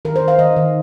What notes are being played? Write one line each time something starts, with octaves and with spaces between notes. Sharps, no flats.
D#3 A#4
C5
D#3
F5
D#3 D#5
D#3